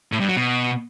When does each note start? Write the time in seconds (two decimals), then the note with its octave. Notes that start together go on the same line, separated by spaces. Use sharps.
0.12 A2
0.20 G2
0.28 F#3
0.37 B2